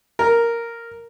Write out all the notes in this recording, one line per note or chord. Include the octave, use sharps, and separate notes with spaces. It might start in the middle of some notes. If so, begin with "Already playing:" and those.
A#4